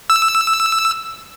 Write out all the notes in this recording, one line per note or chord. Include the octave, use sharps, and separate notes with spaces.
E6